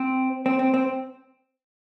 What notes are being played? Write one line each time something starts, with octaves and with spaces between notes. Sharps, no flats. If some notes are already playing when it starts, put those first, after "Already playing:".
Already playing: C4
C4
C4
C4